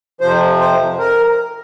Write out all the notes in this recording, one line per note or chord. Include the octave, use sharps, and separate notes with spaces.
F2 C3 F3 C5
C5
A#4